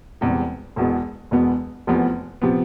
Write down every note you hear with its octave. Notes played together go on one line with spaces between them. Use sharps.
E1 E2 C3 G3
E1 E2 B2 B3
E1 E2 B2 B3
F1 E2 C3 F3 B3
C3 F3 B3